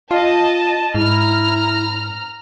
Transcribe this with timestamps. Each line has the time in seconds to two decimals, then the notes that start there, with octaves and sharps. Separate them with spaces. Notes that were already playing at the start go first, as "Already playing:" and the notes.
0.11 F4 D#5 A5
0.95 G#2 E4 A#5 F6